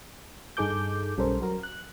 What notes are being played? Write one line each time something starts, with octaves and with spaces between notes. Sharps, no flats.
G2 D#4 G#4 A4 D6 G6
B1 G3 C#4 A4 A#4 C5
F#3 F#4 A#4
F#6